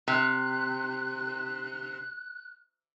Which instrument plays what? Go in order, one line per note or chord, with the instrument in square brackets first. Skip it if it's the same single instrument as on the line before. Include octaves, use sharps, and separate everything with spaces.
[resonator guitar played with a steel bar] C3 [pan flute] F#6